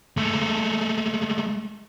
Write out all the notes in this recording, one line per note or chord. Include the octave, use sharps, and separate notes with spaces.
G#3 A3